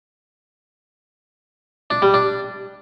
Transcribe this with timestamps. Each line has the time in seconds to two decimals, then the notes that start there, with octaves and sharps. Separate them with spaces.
1.90 D4
2.02 G3
2.14 D4